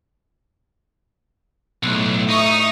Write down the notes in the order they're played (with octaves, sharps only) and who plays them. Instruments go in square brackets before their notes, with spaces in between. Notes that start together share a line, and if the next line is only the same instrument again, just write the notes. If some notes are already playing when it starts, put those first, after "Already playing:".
[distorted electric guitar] B1 [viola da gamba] A2 A3
[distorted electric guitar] D#4 [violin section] E5 C#6 D#6